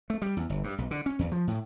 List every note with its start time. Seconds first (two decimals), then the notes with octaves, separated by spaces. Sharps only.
0.10 A3
0.22 G3
0.37 E2
0.50 G1
0.64 G2
0.78 B1
0.91 D3
1.06 C#4
1.19 E2
1.32 F3
1.47 A2